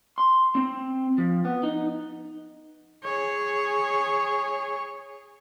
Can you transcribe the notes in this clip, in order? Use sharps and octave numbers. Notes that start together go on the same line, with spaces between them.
C6
C4
F3
B3
D#4
G#4 C#5